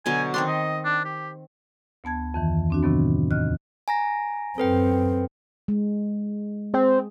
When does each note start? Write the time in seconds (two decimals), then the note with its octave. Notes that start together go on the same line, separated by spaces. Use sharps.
0.06 B2 D3 F#3 G#5
0.34 D#3 C4 D4 C6
0.48 D#5
0.85 D4
1.05 G4
2.04 D2 B3 A5 G#6
2.34 F2 D#3 E3
2.70 C4 D4 F#4
2.83 A2 C3 D#3 F#3 B3
3.31 D#2 A2 D#5 F6 F#6
3.88 G#5 A#5 A#6
4.58 F#2 C4 A4 B4 G5
5.68 G#3
6.74 C4 G#4